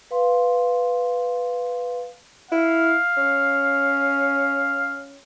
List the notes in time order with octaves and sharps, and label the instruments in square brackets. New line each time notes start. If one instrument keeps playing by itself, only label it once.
[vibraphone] B4 F5 C6
[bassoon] E4 [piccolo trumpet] F5
[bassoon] C#4